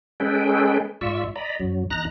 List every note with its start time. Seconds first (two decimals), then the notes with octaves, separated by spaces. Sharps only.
0.20 G#3 C#4 G#4 A4 B4 G5
1.01 G#2 F4 D5 E5 C#6 E6
1.36 D5 D#5 A#5 B5
1.60 F#2 F#3
1.90 E2 D#4 A#5 F#6 A#6